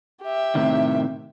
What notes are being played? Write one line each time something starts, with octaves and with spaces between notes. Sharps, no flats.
G4 E5
A2 C3 D#3